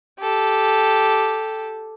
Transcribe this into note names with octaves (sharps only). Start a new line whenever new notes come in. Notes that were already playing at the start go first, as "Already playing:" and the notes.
G4 A4